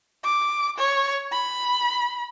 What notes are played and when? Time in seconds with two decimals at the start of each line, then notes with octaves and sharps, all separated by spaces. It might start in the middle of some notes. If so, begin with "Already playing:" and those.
0.24 D6
0.78 C#5
1.32 B5